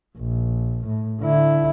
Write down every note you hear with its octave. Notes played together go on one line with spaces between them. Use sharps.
A#1
A2
D3 E4